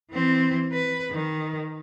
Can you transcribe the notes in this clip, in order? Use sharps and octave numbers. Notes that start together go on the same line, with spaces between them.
E3 C4
B4
D#3